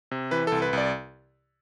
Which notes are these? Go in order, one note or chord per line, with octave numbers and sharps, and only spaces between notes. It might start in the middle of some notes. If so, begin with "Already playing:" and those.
C3
E3 B4
C2 A4
B4
C2 D5